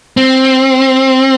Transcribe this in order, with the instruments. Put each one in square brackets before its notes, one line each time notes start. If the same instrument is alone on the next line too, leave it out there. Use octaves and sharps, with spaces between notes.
[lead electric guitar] C4